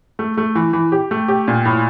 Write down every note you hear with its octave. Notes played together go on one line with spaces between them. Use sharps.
A3
A3
E3
E3
G4
A3
G4
A#2
A2